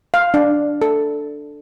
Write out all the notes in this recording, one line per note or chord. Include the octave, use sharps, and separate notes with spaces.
F5
D4
A4